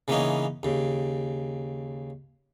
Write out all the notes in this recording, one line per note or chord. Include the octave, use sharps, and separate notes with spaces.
C#3 E3 A#3 B3 C#4 D#4
D#2 C#3